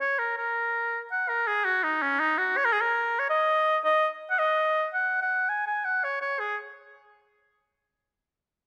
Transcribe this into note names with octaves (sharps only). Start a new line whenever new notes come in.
C#5
A#4
A#4
F#5
A#4
G#4
F#4
D#4
C#4
D#4
F#4
C#5
A#4
G#4
A#4
C#5
D#5
D#5
F#5
D#5
F#5
F#5
G#5
G#5
F#5
C#5
C#5
G#4